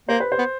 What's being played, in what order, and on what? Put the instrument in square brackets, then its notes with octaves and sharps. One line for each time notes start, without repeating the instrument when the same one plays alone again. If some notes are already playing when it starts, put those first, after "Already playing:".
[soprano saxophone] A#3 [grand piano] C5
[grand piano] B4
C5
[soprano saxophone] B3